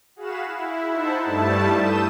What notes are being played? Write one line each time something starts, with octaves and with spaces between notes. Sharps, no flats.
F#4 G#4 F5 F#5 B5 E7
E4
D#4 E4 C5 E5 F#5 A5
G2 G3 A3 E4 A5
D#6 E6 G6 E7